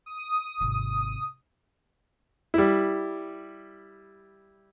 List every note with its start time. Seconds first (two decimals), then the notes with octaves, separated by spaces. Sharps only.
0.06 D#6
0.60 G#1 C3
2.54 G3 E4